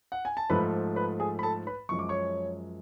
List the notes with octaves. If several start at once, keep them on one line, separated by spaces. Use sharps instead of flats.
F#5
G#5
A5
G#2 F3 A3 B4 B5
B4 B5
G#4 G#5
B5
A4 A5
B4 B5
F#2 F3 G#3 C#6
D6
C#5 C#6